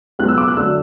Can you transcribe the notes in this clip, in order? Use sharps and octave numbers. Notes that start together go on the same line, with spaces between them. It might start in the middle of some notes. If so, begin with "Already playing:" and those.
C#2 B2 F#3 F#6
E6
D6
F#6
D2 D3 F#3 E6